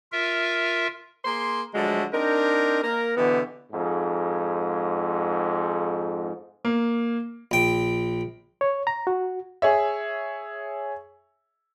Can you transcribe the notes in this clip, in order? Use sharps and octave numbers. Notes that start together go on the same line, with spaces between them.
F4 A#4 E5
A#3 G#4 C6
D3 F3 F#3 G#3 A3
C4 D4 D#4 A#4
A#3 A#4
B2 D3 E3 B3 G4
F2 G#2
A#3
A#1 G5
C#5
A#5
F#4
G#4 C#5 E5